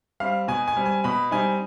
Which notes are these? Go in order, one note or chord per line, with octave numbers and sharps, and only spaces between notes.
G3 C4 F5
B2 G#5
G#5
G3 C4
G#5
B2 B5
G3 C4 D#4 G#5